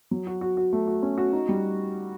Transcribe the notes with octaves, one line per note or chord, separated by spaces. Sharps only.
F#3
F#4
F#4
F#4
A3
F#4
C#4
F#4
D#4
G3